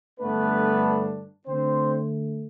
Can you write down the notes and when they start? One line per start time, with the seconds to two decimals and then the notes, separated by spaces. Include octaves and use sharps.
0.19 G2 D3 A3 B3 D4 B4
1.47 D3 A3 C4 D4 C5